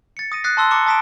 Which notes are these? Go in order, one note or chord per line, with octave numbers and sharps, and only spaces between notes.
A6 C#7
D#6 A#6 D#7
D#6 F#6 A6 B6 C7
A5 C6 E6 G7
A#5 D6 C#7 E7 G7
A5 D#6 B6 D7 E7